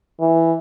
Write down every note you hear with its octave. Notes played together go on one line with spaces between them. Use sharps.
E3